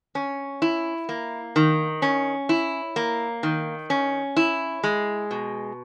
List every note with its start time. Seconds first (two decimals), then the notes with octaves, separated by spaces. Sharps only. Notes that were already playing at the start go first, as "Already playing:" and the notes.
0.15 C#4
0.62 E4
1.09 A#3
1.56 D#3
2.02 C#4
2.49 E4
2.96 A#3
3.43 D#3
3.90 C#4
4.37 E4
4.84 G#3
5.31 B2